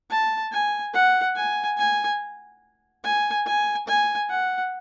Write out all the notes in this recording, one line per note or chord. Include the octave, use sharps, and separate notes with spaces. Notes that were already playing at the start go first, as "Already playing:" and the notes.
A5
G#5
F#5
G#5
G#5
G#5
G#5
G#5
F#5